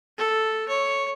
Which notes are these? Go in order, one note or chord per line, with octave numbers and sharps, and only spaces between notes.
A4
C#5